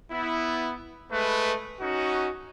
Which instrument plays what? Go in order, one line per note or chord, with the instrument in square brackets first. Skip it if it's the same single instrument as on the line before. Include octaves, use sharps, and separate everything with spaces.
[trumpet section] B3 E4
G#3 A3 B4
C#4 D#4 F#4